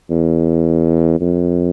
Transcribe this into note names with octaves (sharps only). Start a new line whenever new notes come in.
E2
F2